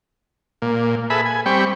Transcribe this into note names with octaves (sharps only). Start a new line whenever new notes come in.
A#2
G#4 A4 B4 E5 B5
G#5
G3 C4 G5 B5 C#6